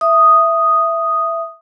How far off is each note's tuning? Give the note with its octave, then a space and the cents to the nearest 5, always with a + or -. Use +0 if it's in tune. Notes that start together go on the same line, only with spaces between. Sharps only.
E5 +10 D#6 +0